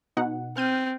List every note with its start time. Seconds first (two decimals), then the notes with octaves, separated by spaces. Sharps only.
0.17 B2 D#4 F#5
0.57 C4 F6 G6 D#7